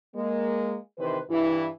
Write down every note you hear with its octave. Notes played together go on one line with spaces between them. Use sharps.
G#3 A#3
C3 D#3 E3 B4 C5
G2 E3 E4